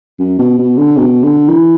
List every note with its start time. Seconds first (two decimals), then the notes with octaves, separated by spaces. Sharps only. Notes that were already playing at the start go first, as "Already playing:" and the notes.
0.19 F#2
0.38 B2
0.58 B2
0.77 D3
0.97 B2
1.23 D3
1.48 E3